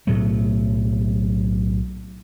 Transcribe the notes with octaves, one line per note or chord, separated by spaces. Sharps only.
B1 A2 F#3 A3